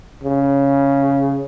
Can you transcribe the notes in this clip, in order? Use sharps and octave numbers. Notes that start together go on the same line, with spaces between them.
C#3